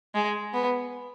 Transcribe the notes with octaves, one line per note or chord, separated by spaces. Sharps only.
G#3
B3